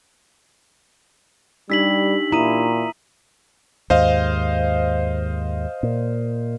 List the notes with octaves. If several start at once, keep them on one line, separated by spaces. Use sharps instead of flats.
G3 D4 D#4 G4 E6 B6 F#7
A#2 E4 A#5 D#6 D#7
D#2 G#2 C5 D#5 F5
A#2